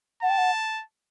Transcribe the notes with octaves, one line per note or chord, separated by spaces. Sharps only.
F#5 A5
G5
F#5